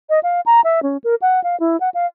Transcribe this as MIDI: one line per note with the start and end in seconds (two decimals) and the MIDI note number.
0.10 0.19 75
0.23 0.41 77
0.46 0.61 82
0.64 0.83 76
0.83 0.97 61
1.04 1.15 70
1.22 1.42 78
1.44 1.58 77
1.60 1.79 64
1.80 1.89 78
1.94 2.06 77